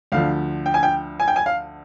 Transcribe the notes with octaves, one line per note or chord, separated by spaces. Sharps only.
D2 D3 F3 F5
G5
G#5
G5
G#5
G5
G#5
F5